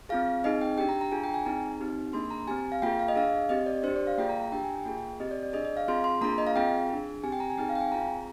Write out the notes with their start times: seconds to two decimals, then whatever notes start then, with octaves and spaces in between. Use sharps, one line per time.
0.09 C4 F4 G#4 F5
0.44 C4 D#4 G#4 D#5
0.61 G5
0.78 D4 G4 G5
0.89 A#5
1.01 A#5
1.12 D4 F4 G#4 G#5
1.24 G5
1.34 G#5
1.46 C4 D#4 G#4 A#5
1.80 C4 D#4 G4
2.13 A#3 D4 G#4 C6
2.31 A#5
2.48 C4 G4 G#5
2.72 F5
2.82 A#3 F4 G#4 G5
2.99 F5
3.08 D#5
3.16 D4 G#4 F5
3.49 C4 G4 D#5
3.66 D5
3.83 D4 C5
3.88 G4
3.96 D5
4.07 F5
4.18 A#3 F4 G#4 G5
4.29 A#5
4.41 A#5
4.52 D4 G4 G5
4.64 G#5
4.75 G5
4.85 A#3 F4 G#4
5.20 C4 G4 D#5
5.31 D5
5.43 D5
5.53 D4 G#4 D#5
5.65 D#5
5.77 F5
5.88 C4 F4 G#4 C6
6.04 C6
6.21 A#3 D4 F4 G#4 A#5
6.38 D#5
6.47 F5
6.55 C4 F4 G#4 G5
6.90 D4 G#4
7.24 C4 G4 G#5
7.32 G5
7.40 A#5
7.50 G#5
7.58 C4 D#4 G#4 G5
7.69 F5
7.75 G5
7.81 G#5
7.92 C4 F4 G#4 A#5